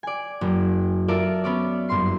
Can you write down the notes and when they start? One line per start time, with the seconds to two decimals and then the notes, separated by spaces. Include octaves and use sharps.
0.03 D5 G#5
0.41 F#1
1.08 F4 A4 A#4 D5 E5
1.44 B3 C#4 D5
1.89 F#1 G2 C6 C7